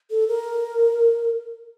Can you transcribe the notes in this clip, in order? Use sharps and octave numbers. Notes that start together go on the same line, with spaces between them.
A4
A#4